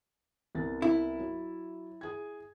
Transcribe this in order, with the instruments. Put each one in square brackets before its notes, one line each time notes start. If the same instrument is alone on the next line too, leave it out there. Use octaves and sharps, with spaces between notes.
[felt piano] C2 B3 A6
[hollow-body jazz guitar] E4
[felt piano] F#3
G#4 G#6